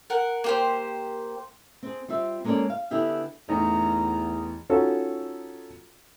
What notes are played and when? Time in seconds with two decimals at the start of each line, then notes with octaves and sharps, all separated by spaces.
0.10 A#4 F#5
0.44 A#3 G4 C5
1.83 C4 G#4
2.08 G3 C4 F4 E5
2.44 G#3 A#3 C#4 A4 C#5 D5
2.70 F5
2.91 D3 B3 E4 G4 G#4
3.49 A1 E2 A3 D#4 A#5
4.70 C#4 D#4 F4 F#4 A4